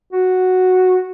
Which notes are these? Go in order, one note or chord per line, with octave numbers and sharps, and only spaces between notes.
F#4